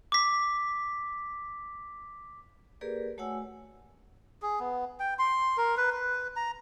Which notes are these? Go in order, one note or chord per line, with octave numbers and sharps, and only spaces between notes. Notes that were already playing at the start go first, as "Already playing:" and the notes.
D6 B6
A#3 G4 G#4 A#4 B4 D5
A3 F#4 C#5 F#5 G#5 E6
G#4
B3
G5
C6
A#4
B4
B4
A#5